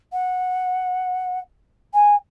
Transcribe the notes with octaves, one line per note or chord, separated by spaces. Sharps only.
F#5
G#5